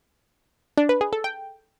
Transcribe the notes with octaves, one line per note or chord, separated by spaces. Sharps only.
D4
B4
G#4
A4
G5